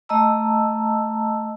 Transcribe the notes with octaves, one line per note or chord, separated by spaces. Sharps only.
A3 D#5 A5 A#5 E6